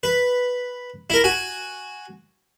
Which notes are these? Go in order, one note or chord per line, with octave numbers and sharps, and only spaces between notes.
B4
E4 A#4
F#4 G#5